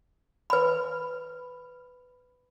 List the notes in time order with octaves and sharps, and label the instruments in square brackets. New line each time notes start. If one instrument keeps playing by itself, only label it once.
[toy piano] B4 B5